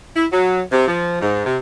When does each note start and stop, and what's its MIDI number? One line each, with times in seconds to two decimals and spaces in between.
0.15 0.26 64
0.32 0.62 54
0.72 0.86 48
0.88 1.19 53
1.21 1.45 44
1.45 1.57 48